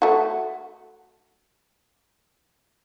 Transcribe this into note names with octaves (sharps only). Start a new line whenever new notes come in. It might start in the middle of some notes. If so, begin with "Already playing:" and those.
A3 F#4